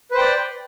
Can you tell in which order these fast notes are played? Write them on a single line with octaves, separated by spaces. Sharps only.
B4 C5 G5 D5